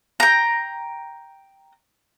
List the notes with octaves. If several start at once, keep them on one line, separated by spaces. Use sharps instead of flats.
G5 A#5